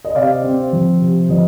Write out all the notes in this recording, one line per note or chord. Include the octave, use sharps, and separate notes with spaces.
D#5
C3 D5 F5
C4
F3
C3
F3 D#5